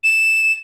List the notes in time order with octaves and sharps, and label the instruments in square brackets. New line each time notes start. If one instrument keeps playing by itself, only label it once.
[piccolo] E7